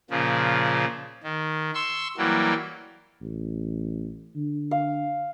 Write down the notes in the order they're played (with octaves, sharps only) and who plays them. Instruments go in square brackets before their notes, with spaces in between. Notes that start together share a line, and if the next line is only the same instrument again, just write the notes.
[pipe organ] A#2 C#3 F3
D#3
C6 C#6 E6
E3 F#3 G3 A#3
[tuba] A1
D3
[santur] F5